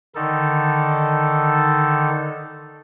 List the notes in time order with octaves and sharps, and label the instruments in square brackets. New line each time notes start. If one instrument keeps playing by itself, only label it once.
[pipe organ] D3 D#3 D#4 A4